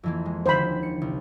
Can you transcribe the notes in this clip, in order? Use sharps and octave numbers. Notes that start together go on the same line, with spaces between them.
F2 E3 A#3
G#3
D#2 D3 C5 B5
C#7
C2